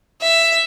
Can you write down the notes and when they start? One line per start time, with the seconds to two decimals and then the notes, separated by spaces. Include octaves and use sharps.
0.21 E5